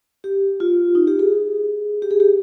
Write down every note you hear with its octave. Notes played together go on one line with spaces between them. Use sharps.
G4
F4
D#4
G4
G#4
G4
G#4
G4